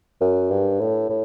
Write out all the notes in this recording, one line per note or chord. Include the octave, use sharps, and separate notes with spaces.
F#2
G2
A2
A2